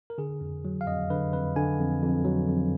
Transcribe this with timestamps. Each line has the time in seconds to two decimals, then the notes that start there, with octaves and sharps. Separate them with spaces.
0.10 A#4
0.18 D3 G#4
0.41 F2
0.65 F#3
0.81 F5
0.87 F2 D#5
1.10 D3 B4
1.33 F2 B4
1.56 D3 G#5
1.79 F2
2.02 F2
2.25 F#3
2.49 F2